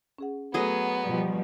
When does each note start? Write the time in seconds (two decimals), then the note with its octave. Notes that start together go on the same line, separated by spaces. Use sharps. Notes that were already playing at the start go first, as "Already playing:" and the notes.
0.19 C#4 G#4 F#5
0.54 F#3 A3 B3 G#4 A4 C#5 D#5
1.03 B2 F3 G3